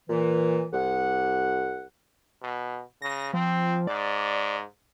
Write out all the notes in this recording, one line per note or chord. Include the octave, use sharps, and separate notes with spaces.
A#2 E3
C2 F#5
B2
C#3 A#6
F3 C4
G#2 D5